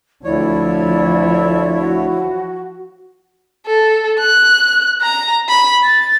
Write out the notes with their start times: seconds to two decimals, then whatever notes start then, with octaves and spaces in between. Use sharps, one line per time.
0.25 D2 F3 E4 C#5 D5
1.80 F#4
3.67 A4
4.20 F#6
5.02 A#5
5.49 B5
5.83 A6